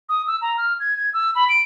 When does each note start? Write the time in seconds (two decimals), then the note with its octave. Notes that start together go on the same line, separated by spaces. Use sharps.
0.09 D#6
0.27 E6
0.42 A#5
0.58 F6
0.80 G#6
0.97 G#6
1.14 E6
1.35 B5
1.49 D7